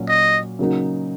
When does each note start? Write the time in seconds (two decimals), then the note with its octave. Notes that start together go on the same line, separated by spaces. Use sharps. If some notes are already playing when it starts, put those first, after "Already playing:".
Already playing: A#2 F#3 C#4
0.08 D#5
0.59 C#3 F#3 A#3 D#4 F#4